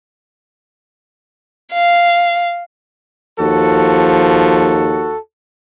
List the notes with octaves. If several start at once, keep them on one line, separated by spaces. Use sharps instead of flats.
F5
D#2 F3 F#4 A4